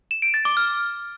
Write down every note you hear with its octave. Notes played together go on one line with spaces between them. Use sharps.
E7
D7
A6
D6
F6